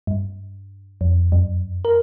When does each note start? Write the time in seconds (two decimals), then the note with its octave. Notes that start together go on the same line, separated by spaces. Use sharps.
0.07 G2
1.01 F2
1.32 F#2
1.85 A#4